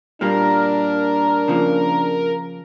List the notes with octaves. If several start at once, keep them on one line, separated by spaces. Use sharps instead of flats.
A#2 G3 A#3 D4 A#4
C#3 F3 A#3